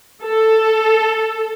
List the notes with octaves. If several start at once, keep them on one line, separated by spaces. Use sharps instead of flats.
A4